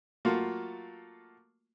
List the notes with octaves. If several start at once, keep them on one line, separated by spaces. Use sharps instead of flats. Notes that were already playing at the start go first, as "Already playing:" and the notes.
F#3 A3 A#3 F4 F#4